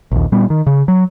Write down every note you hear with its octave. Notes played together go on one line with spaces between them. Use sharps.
A#1 D#2
A#2 G3 B3
D#3
C#3
F#3